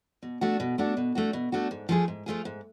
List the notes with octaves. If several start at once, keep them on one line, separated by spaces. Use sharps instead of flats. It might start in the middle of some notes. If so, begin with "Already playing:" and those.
B2
A3 D4 F#4
B2
A3 D4 F#4
B2
A3 D4 F#4
B2
A3 D4 F#4
G#2
F3 A3 F4 G#4
G#2
F3 A3 F4 G#4
G#2